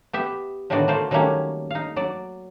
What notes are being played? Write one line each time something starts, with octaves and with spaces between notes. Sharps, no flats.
B3 G4 E5
A2 D3 D#3 B3 F#4 D5
A3 A#3 C5 D5
D#3 F#3 G3 A3 A#3 C#4
D#4 F5
F#3 D5